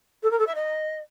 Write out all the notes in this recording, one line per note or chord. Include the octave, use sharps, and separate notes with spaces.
A4
A#4
A4
E5
D#5